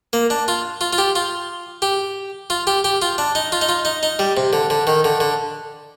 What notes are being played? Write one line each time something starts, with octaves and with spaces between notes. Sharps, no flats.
A#3
D4
F4
F4
F4
G4
F4
G4
F4
G4
G4
F4
D4
D#4
F4
D#4
F4
D#4
D#4
G3
C3
D3
D3
D#3
D3
D3